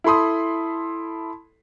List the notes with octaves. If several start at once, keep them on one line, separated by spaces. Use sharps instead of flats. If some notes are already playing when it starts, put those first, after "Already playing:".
E4 A4 B5 C6 D#6